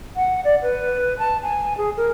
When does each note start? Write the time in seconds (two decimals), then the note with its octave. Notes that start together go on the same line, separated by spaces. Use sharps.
0.16 F#5
0.44 D5
0.62 B4
1.19 A5
1.43 G#5
1.78 G#4
1.97 A#4